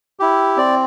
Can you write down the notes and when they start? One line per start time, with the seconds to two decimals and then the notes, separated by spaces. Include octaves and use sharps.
0.20 E4 G4
0.57 C4 D5